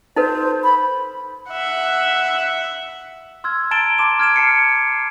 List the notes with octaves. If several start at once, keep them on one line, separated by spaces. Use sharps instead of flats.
D#4 A4 B4 C5
B5
E5 F#5
C6 E6 F6 G#6
A5 A#5 A6 D7 E7 G7
A5 C6 D6 E7
F6 G#6 D7 E7
A5 C7 C#7